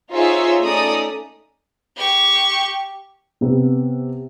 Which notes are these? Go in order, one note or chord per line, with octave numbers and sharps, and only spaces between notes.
D#4 F4 G#4 C5 C#5 E5
A3 C#4 D#4 D5 A#5 D#6
G4 C#6
C3 B3